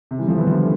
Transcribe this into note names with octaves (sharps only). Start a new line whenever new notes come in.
C3
E3 G3
F3 A3
G3 B3
D3 F3